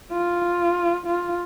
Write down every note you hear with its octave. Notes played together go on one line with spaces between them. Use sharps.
F4
F4